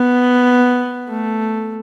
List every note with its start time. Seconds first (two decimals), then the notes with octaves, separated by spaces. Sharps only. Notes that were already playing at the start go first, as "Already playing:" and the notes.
Already playing: B3
1.09 A3